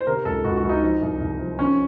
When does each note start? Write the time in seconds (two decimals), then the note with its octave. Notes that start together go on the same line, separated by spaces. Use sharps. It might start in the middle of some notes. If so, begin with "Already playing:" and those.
0.01 C5
0.07 C3 A#4
0.25 C#2 A4
0.44 C#2 F#4
0.57 F#4
0.64 C#2
0.69 D#4
0.82 F3
1.02 C2
1.21 C2
1.39 F3
1.58 F3 C#4